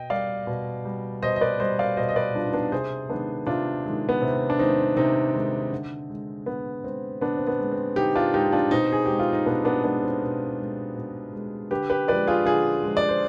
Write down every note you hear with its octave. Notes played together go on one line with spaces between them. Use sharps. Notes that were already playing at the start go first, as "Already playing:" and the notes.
Already playing: B2 D#5 G5
G3 D5 F5
B2
G3
B2 C5 D#5
D#5
B4 D5
G3 C5 D#5
D5 F5
B2 C5 D#5
D#5
B4 D5
G3 D4 F4
D#4
B3 D4
C3 G#4 C5
D#3 G#3 B3 D4
C3 D4 F4
D#3 G#3
B3
C3 C4
D4
D#3 G#3 C4 D#4
C3 C4 D#4
D#3 G#3
D3
G#3
D3 B3
G#3 C4
D3 B3 D4
C4
B3
G#3
C4
D3 D#4 G4
D4 F4
G#3 D#4 G4
D4 F4
B2 C4 D#4
G#4
G#3 G4
F4
D#4
B2 B3 D4
B3 D4
G#3 B3 D4
C4
B2
G#3
B2
G#3
D3 G4 B4
G4 B4
F3 G#3 B4 D5
F4 G#4
D3 F4 G#4
F3 G#3
D5
C5